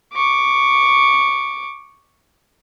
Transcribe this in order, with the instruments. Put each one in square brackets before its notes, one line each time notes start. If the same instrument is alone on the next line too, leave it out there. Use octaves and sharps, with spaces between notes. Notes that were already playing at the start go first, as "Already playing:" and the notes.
[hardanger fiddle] C#6 D6